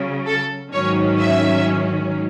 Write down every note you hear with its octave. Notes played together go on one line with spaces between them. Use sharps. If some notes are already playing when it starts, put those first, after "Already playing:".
Already playing: C#3 F#3 C#4
A4
G#2 D#3 F#3 C#4 C#5
E5